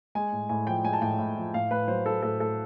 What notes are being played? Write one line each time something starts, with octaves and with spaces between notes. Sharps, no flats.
G#3 G#5
A2
A2 G#5
F3 G5
G#3 G#5
A5
A2 G5
A2
F3
A2 F5
A2 B4
F#3 C5
F#3 A4
A2 A4
A2 A4